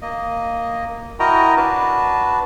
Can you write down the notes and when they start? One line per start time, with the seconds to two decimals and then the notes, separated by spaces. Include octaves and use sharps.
0.02 A#3 D#5
1.20 E4 F#4 A#4 D#5 G5 A#5
1.57 D4 F#4 B4 A5